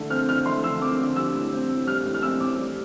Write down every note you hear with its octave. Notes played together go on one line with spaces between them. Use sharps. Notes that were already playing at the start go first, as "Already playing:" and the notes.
Already playing: D3 A3
C4 F6
D3 F6
A3 C6
D3 E6
C4 D6
D3
G3 E6
A2
C4
A2
G3 F6
A2
F6
C4 E6
A2 D6
G3